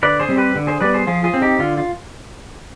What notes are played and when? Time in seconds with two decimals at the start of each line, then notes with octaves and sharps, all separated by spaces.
0.03 D3 B4 D5
0.20 G#4 C5
0.29 G3 C4
0.37 G4 B4
0.56 D3
0.67 G#4 C5
0.81 G3 B3 B4 D5
0.94 G#4 C5
1.07 F3 F4 G#4
1.24 F4 G#4
1.34 C4
1.42 D#4 G4
1.59 D3 F4
1.78 F4